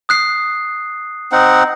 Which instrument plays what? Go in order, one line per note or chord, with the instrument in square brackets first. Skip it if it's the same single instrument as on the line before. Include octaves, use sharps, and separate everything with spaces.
[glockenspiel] D#6 F#6 C7
[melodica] C4 D#4 F#5